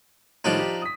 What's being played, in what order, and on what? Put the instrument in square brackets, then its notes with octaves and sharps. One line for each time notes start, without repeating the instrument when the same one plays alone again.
[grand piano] A2 D#3 G3 [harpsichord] F3 D4 D#4
[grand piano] G4
D#6 B6